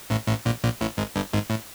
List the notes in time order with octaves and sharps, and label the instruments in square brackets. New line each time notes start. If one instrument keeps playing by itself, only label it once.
[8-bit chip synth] A1 A2
A1 A2
A#1 A#2
A#1 A#2
A1 A2
G#1 G#2
G1 G2
G#1 G#2
A2